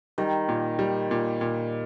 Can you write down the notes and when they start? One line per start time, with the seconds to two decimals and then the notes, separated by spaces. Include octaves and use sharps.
0.18 D#3 G3
0.49 A#2
0.79 G3
1.11 A#2
1.41 A#2